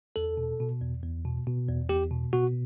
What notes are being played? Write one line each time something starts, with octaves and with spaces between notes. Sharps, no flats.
E2 A4
B2
B2
E2
E2
B2
B2
E2
E2 G4
B2
B2 F#4